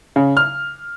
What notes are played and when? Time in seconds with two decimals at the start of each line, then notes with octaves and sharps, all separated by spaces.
0.16 C#3
0.37 F6